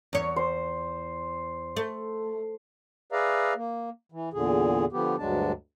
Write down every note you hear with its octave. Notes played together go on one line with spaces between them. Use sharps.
E2 C#5
C5
A3
G#4 B4 D5 E5 F5 A#5
A#3
E3
E2 A#2 D3 G#4
D3 F3 B3 G4
D2 G2 F#3 G#3 D4 A5